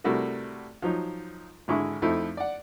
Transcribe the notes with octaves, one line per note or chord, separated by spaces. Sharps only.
C3 G3 A3 E4 F#4 A#4
F3 F#3 D#4
G#1 D3 G#3 E4 E5 C#6
F2 F3 A3 D#4 E4
D5 F#5